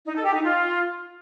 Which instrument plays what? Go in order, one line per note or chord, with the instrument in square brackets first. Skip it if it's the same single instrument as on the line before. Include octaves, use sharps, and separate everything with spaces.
[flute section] D#4
A4
G4
D#4
F4